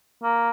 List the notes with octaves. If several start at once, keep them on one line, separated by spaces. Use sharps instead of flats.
A#3